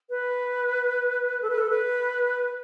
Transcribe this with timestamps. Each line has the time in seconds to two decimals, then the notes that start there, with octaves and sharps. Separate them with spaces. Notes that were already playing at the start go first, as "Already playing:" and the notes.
0.10 B4
1.42 A4
1.50 B4
1.58 A4
1.70 B4